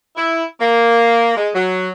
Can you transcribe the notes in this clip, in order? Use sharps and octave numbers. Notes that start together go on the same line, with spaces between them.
E4
A#3
G#3
F#3